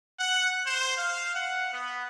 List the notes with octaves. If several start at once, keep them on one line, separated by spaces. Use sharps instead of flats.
F#5
C5
F5
F#5
B3